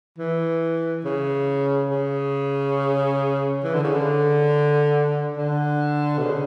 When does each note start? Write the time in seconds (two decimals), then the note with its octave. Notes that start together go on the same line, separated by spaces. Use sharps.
0.18 E3
1.05 C#3
1.91 C#3
3.64 E3
3.74 D3
3.84 C#3
3.94 D3
5.37 D3
6.18 B2
6.23 C#3